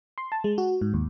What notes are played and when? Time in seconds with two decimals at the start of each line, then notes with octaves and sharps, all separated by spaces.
0.18 C6
0.32 A5
0.44 G#3
0.58 F#4
0.81 G#2
0.94 D#2